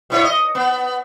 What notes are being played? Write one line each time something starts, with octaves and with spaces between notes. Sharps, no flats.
B2 E4 C#5
D#5
B3